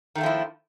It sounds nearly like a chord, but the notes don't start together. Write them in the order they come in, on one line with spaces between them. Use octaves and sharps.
D#3 A3 A#3 F3 E4